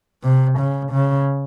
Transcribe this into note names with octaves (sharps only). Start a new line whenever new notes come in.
C3
C#3
C#3